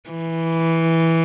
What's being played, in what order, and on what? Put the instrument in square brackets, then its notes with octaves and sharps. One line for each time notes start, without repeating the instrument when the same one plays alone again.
[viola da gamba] E3